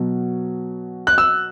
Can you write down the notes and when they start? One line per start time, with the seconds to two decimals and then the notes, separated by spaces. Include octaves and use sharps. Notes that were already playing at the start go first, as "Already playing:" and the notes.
Already playing: B2 F#3
1.07 F#6
1.18 E6